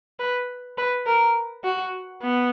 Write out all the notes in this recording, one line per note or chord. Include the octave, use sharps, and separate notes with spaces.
B4
B4
A#4
F#4
B3